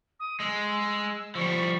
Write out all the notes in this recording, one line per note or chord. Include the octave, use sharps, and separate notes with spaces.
D#6
G#3 E6
F3 G3 C#6